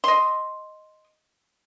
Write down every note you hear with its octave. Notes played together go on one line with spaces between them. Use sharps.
D#5 C6